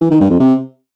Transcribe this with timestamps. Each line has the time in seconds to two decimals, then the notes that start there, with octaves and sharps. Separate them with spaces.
0.01 E3
0.11 D#3
0.20 G2
0.30 F2
0.39 C3